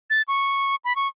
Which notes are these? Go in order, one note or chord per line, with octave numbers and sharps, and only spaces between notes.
A6
C#6
B5
C#6